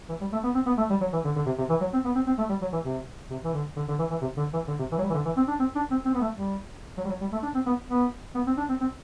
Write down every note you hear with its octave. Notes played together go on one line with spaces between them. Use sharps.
E3
G3
A3
B3
C4
B3
A3
G3
F#3
E3
D3
D3
C3
C3
E3
F#3
C4
B3
C4
C4
A3
G3
F#3
E3
C3
C3
E3
D3
D3
D3
E3
E3
C3
D3
E3
D3
C3
E3
F#3
G3
E3
D3
E3
C4
D4
C4
D4
C4
C4
B3
A3
G3
F#3
G3
F#3
G3
A3
D4
C4
B3
B3
B3
C4
D4
C4
C4